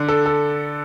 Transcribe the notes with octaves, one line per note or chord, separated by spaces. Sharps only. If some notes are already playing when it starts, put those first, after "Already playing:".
Already playing: D3
A4
A4